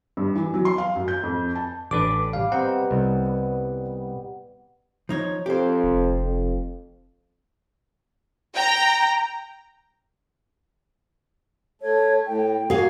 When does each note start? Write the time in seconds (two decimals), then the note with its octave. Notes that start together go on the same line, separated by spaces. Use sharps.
0.17 G2
0.35 E3
0.54 F#3
0.65 C6
0.78 F5
0.96 F#2
1.08 G6
1.23 F2
1.56 A5
1.91 A1 D4 B4 D6
2.33 G3 F5 D6
2.52 B3 C4 D#4 F#5
2.91 C2
3.25 B3
5.09 F3 D#4 C#5
5.46 F2 G4 C5
5.84 F1
6.22 F2
8.54 G5 A#5
11.82 A3 C#5
12.27 A2 G5
12.70 A#3 F#4 G#4 F5 G#5